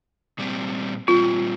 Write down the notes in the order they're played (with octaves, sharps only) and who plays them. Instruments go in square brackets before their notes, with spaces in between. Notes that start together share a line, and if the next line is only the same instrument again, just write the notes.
[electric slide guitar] A#2 G3 C4
[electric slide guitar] A#2 G3 C4 [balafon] F4